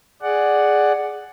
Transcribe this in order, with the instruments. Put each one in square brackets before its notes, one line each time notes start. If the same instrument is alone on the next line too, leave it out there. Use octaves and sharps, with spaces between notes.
[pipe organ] G#4 D5 F#5